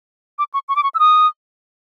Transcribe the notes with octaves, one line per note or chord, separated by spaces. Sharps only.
D6
C#6
C#6
D6
C#6
E6
D#6